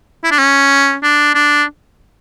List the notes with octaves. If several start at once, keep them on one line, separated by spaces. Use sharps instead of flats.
E4
D4
C#4
D4
D4